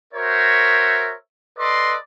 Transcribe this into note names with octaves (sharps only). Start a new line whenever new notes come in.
F#4 A#4 C5 C#5 E5
A4 B4 D5 D#5 C6